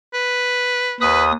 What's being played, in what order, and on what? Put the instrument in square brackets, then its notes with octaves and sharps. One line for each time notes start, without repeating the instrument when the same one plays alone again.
[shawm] B4
[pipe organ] D#2 D#6 [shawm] B4